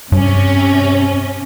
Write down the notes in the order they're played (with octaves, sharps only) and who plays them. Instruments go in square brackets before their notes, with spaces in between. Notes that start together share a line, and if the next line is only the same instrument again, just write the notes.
[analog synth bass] G2 [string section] C3 C#4